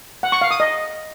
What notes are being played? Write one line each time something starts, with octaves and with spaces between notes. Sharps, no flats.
F#5
C#6
F5
D#6
D#5